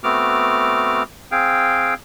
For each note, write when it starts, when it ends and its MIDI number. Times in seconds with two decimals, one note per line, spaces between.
0.04 1.03 57
0.04 1.03 59
0.04 1.03 60
0.04 1.03 66
0.04 1.03 86
0.04 1.03 89
1.32 1.94 60
1.32 1.94 68
1.32 1.94 77
1.32 1.94 79